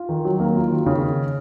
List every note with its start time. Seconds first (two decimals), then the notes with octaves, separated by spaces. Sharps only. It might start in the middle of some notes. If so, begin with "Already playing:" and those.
Already playing: F4
0.09 D#3
0.25 F#3
0.40 A#3
0.56 F4
0.71 D#3
0.86 C#3